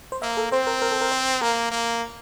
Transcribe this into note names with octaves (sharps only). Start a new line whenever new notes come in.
C5
A#3 E5
A4
C4 C5
A#4
A#4
A4
A#4
C5
A#3 A#4
A#3